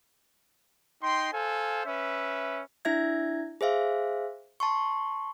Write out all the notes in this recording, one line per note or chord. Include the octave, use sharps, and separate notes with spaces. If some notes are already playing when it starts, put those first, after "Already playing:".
D#4 G5 C6
A4 C5 F5 G#5
C#4 B4 E5
D4 E4 E5 G#6
G#4 C5 E5 F5
A5 C6 C#6